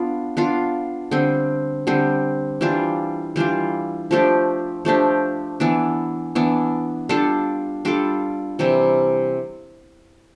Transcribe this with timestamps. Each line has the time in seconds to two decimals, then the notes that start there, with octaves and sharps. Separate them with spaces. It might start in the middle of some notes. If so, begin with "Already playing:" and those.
Already playing: B3 D4 F4
0.37 B3 D4 F4
1.11 D3 G3 C4
1.87 D3 G3 C4
2.61 E3 G3 D4 F4
3.36 E3 G3 D4 F4
4.11 F3 A3 D4 G4
4.85 F3 A3 D4 G4
5.60 E3 B3 D4
6.35 E3 B3 D4
7.09 G3 D4 F4 A4
7.85 G3 D4 F4 A4
8.59 C3 E3 G3